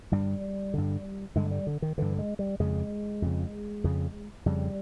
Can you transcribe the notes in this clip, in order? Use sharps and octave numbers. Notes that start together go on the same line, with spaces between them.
G2 D3 G3
G2 D3
G2 D3 G#3
G3
D3
D#3
G2 D3 E3
G#3
G3
F2 C#3 G#3
F2 C#3
F2 C#3
F2 C#3 G3